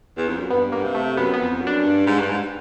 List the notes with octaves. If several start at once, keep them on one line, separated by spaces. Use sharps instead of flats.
E2
F2
F#2
G2 B3
A#3
C3
A3
F#2 B3
B3
F2
F#2
D4
G2
G#2
G2
G#2